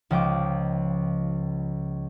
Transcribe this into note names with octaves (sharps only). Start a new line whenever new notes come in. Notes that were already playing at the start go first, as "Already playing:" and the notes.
C#2 F3 D#5 G5 D6